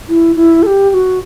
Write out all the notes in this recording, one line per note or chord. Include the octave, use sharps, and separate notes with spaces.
E4
E4
A4
G4
G4
F#4